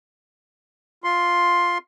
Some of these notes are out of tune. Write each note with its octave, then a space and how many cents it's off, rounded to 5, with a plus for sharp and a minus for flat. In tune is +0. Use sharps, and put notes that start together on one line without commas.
F4 +0 C6 +5